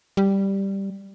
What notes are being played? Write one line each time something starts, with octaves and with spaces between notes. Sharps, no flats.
G3